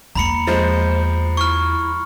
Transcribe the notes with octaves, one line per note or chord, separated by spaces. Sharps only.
E2 A#3 A#5 B5 C#7
F3 G#3 C5
E4 C#6 F6